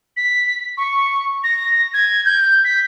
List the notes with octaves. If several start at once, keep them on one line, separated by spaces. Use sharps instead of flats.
B6
C#6
A#6
G#6
G6
B6